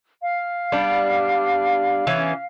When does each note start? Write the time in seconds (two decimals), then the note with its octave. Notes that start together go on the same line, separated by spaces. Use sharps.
0.22 F5
0.72 G3 B3 D4
2.07 E3 B3 C#4